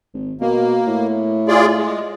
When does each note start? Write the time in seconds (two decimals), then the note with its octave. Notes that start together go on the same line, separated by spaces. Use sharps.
0.14 G#1
0.41 B2 A#3
0.87 A2
1.48 F4 G#4 D5
1.78 G#3